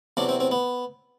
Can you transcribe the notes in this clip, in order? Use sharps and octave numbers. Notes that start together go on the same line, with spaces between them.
E2 C3 F#3 D4
C4
C4
B3